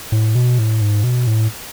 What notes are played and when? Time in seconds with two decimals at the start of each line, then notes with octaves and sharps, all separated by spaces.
0.12 A2
0.35 B2
0.59 A2
0.81 G#2
1.03 B2
1.27 A2